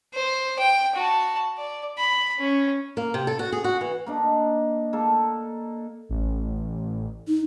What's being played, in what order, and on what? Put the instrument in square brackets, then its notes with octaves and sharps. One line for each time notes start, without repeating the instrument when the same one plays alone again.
[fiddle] C5
G5
F#4 A5
D5
B5
C#4
[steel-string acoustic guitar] A#3
C3
A4
F#4
G#4
F#4
E3
[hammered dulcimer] A#3 D4 D#4
A#3 A4
[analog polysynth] A1
[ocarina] D#4